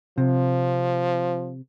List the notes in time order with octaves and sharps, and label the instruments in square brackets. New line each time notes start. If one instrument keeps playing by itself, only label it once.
[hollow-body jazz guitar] C3 [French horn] F3